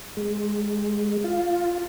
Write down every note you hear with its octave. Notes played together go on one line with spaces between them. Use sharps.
G#3
F4